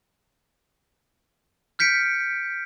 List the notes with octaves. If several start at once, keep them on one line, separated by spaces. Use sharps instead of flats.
F6 G6 B6 C#7 D7